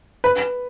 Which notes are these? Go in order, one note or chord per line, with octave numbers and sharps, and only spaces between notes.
B4